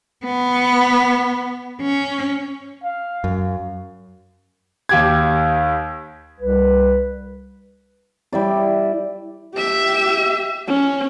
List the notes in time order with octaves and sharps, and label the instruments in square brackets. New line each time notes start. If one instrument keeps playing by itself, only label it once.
[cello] B3
C#4
[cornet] F5
[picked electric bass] F#2
[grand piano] D#2 G4 G#6
[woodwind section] C2 G3 B4
[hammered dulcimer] G3 E4 D5
[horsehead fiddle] G4 E5
C#4